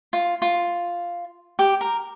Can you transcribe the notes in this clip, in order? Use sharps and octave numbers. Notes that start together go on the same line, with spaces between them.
F4
F4
G4
A#4